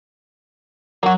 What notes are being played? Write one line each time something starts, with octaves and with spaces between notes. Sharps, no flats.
F#3 A#3 F#4